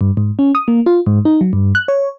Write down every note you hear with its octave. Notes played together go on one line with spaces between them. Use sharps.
G2
G#2
C#4
D#6
A#3
F4
G#2
D#4
F#3
G2
F#6
C#5